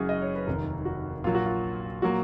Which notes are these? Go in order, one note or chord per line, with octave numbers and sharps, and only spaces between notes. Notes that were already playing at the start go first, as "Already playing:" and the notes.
Already playing: F#1 F#2 C#3 G#3 F#4 G#4
D#5
C#5
B4
F1 D#2 D#3 A#4
F#4
A#1 A#2 F#3 F4
F#4
F4
A#2 F#3 A#3 F#4